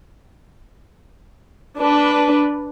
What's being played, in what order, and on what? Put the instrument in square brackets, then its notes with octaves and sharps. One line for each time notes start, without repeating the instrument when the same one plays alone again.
[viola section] D4 B4